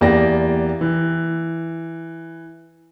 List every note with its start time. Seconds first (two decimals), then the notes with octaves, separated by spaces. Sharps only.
0.01 E2 A#3 E4 G4 D5 A#6
0.81 E3